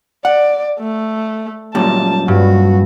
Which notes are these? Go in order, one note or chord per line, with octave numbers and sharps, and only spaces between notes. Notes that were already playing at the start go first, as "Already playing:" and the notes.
D5 F#5
A3
F#2 A#2 G3 A5
G2 F#4